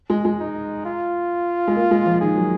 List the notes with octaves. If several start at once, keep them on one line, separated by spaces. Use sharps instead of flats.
G#3
G#3
D#4
F4
G#3
A#3
G#3
F3
D#3 G#4
F#3